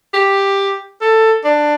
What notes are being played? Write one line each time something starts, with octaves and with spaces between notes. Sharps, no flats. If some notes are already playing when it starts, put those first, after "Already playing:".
G4
A4
D4